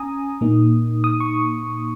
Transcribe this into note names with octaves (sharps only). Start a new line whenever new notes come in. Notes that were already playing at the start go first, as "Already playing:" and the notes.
Already playing: C#4 G#5 A#5 D#6
A#2 A#3 D#4
D#6
C#6